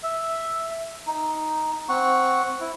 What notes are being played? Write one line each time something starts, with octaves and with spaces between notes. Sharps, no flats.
E5
D#4
C4 F#5 C#6
E4